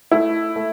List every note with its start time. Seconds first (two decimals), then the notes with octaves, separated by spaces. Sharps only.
0.11 A3 E4
0.56 A3